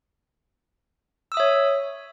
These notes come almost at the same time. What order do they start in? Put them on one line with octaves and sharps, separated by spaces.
E6 D#6 E5 C#5